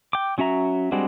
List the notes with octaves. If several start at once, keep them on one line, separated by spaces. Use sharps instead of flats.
G5 D6
F#3 C#4 F#4 E5 A#5
G3 G#3 C4 D4 F#4